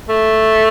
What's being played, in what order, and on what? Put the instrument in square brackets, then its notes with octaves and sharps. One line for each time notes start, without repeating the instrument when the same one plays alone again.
[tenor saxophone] A3